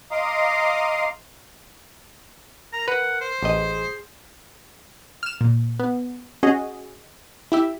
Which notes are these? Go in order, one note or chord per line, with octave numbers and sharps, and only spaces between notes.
D#5 F5 A#5 C6 D6 D#6
A#4 A#5
B4 F#5
C5
A1 G#4 D#5
F6 E7
A#2
B3
C#4 F#4 G#4 D#5
E4 G4 E5